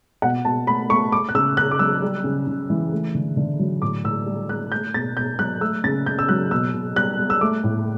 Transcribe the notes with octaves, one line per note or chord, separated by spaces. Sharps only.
B2 F#5
B2 A5
A3 B5
A3 C#6
A3 D6
F#6
C#3 E6
C#3 F#6
D6
F#3 E6
G3
C#3
C#3
E3
A3
D3
D3
F#3
A2 D6
A2 E6
G3
G3 F#6
A3 G6
B2 A6
B2 G6
F#3 F#6
A3 E6
C#3 A6
C#3 G6
E6
F#3 F#6
B2 E6
B2
G3 F#6
G3
E6
A3 D6
A2